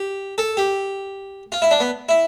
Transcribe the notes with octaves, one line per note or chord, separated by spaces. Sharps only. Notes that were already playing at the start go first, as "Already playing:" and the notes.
Already playing: G4
A4
G4
F4
E4
D4
B3
E4